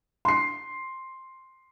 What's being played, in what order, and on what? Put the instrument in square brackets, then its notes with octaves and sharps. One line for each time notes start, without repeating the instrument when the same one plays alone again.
[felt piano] C6 C7